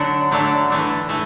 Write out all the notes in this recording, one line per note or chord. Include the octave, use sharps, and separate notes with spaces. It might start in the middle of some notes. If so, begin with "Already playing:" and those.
Already playing: D3 F#3 A3 D4 F#5
D3 F#3 A3 D4
E3 A3 D4
E3 A3